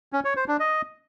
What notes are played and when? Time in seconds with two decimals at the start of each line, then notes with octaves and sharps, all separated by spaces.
0.13 C#4
0.24 C#5
0.36 C5
0.48 D4
0.60 D#5